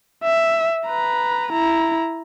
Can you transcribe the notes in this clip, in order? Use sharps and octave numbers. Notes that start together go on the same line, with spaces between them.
E5
B4 A#5
E4 A#5